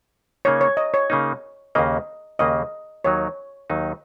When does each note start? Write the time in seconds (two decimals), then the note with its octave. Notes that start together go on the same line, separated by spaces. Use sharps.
0.45 C#3 A#3 D#4 C#5
0.61 C#5
0.77 D#5
0.94 C#5
1.10 C#3 A#3 D#4
1.75 D#2 C#3 A#3 D#5
2.39 D#2 C#3 A#3 D#5
3.05 D#2 D#3 F#3 D#4 C#5
3.70 D#2 D#3 F#3 D#4